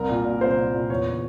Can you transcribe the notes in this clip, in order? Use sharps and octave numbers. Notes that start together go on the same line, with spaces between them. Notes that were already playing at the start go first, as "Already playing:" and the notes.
Already playing: C2 A#4
A#2
A#2
C2 C5
C2
A#2
E2 C#5
C#3